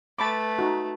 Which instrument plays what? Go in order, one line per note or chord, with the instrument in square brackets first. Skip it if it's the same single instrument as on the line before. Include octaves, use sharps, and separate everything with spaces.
[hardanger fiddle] A3 B4 [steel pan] A5 B5 D6
[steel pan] D#4 F#4